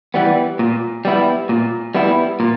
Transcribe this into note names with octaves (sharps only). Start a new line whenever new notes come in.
E3 G3 B3
A#2
G3 B3 E4
A#2
G3 B3 E4
A#2